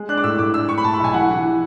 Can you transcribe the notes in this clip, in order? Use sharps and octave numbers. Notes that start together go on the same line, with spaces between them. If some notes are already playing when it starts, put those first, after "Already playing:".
Already playing: G#3
D4 F#6
D6
A2 E6
A2 D6
D4 E6
A2 C#6
B5
A2 A5
B5
B1 G#5
E3 F#5
E3
E3